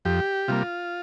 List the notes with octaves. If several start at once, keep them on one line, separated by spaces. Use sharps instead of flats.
F2 G4
C3 G3 A#3 F4